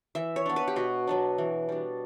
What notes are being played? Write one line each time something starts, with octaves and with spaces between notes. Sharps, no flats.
E3 E5
C#5
B3 D4
B4
G4
B2 F#4
F#3 B3 D4
E3
G3 D4